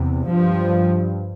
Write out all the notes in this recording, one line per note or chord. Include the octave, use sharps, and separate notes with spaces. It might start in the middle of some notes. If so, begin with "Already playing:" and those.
Already playing: E2 C3
G2 F3